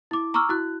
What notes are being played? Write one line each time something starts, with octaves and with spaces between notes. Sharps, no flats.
E4 D6
A#5 C#6 D6 E6 F6
E4 F#4 F#6